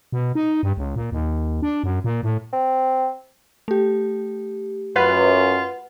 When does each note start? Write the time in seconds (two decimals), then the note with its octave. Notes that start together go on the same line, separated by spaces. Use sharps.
0.12 B2
0.35 D#4
0.63 G2
0.77 C#2
0.96 A#2
1.12 D#2
1.62 D4
1.84 F#2
2.04 A#2
2.23 A2
2.53 C4
3.68 A3 G4
4.96 F#2 F4 B4 F#5